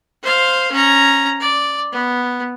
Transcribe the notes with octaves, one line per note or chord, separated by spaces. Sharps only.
C5 F5
C#4 A#5
D5
B3